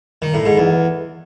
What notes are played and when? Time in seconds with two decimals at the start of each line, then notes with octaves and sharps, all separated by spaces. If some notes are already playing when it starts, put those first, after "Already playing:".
0.22 D#3
0.34 A2
0.46 G#2
0.57 E2